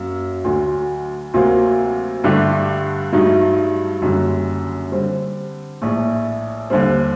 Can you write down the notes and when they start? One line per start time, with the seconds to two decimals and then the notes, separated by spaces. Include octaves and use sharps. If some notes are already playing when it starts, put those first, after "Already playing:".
Already playing: F#2 F#3 A#3
0.44 D2 D3 F#3
1.34 D2 C3 F#3 A#3
2.24 G2 D3 A3 D4 G4
3.13 G2 F#3 A3 D#4
4.02 F#1 F#2 D3 G3
4.92 D3 G3 C4
5.82 A#1 A2 A3
6.70 D#2 D3 G3 C4